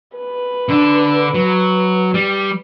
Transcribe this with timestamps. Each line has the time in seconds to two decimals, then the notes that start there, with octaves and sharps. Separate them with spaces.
0.17 B4
0.69 D3 D4
1.34 F#3
2.14 G3